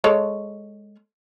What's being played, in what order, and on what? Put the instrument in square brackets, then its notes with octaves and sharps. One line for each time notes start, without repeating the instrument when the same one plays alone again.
[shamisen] G#3 A4 C#5